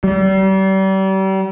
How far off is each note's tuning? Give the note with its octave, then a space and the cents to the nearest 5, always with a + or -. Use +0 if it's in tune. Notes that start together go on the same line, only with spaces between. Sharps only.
G3 -35